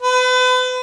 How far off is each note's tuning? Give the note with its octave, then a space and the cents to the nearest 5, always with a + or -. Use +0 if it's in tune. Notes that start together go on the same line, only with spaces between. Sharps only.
B4 +40